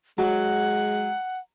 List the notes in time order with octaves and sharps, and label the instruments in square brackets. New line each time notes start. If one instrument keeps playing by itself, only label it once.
[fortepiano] F#3 [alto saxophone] G#3 [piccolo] F#5